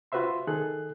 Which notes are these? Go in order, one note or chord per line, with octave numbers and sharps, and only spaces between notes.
F4 F#4 B4 C5 E5 C6
D#3 G#4 A4 F#6